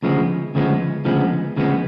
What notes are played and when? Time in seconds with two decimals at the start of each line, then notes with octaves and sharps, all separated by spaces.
0.03 D2 C#3 F3 G#3 B3
0.55 D2 C#3 F3 G#3 B3
1.05 D2 C#3 F3 G#3 B3
1.56 D2 C#3 F3 G#3 B3